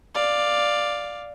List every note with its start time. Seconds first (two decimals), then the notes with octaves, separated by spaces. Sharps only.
0.14 D5 F5